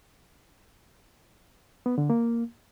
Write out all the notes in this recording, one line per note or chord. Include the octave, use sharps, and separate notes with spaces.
B3
D3
A#3